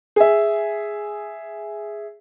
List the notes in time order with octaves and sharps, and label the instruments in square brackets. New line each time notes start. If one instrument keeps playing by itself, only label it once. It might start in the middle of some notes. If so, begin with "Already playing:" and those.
[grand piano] G#4 E5